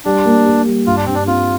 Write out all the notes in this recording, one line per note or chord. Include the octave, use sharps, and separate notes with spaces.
G3 D4
A#3
G4
G3
G2 F4
D4
G2 C4
D4
C4 F4